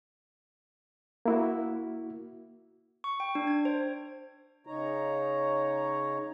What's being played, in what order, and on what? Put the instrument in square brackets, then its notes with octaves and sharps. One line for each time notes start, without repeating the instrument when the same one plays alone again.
[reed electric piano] A#3 E4 F#4
[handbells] C#6
G5
D4
G#6
C5
[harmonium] C#3 D#4 C#5 A#5